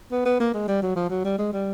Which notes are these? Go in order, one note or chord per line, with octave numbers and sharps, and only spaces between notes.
B3
B3
A#3
G#3
G3
F#3
F3
F#3
G3
G#3
G3